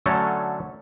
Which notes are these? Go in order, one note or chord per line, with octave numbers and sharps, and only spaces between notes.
D3 F#3 A3 C#4 A4 C#5